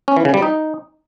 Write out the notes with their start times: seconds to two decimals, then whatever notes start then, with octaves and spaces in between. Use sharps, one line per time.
0.08 C#4
0.16 E3
0.25 C#3
0.34 G3
0.42 D#4